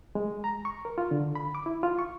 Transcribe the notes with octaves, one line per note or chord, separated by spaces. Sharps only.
G#3
A#5
C#6
A#4
F4
D3
B5
D6
E4
F4
C#6